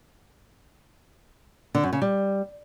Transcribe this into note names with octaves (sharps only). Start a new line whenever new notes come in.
D3
F#2
C#3
G3